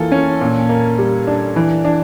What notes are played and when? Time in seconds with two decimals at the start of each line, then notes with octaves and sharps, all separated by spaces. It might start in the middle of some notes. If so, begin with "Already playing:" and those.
Already playing: E3 A#3 F4 A4
0.12 C#4
0.41 A#2
0.69 A#3
0.98 G3
1.27 D4
1.56 E3
1.85 D4